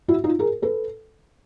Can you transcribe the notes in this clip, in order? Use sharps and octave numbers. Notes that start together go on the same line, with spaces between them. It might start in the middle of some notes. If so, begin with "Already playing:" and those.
E4 F#4
D#4 F4
G#4 A#4
A4 B4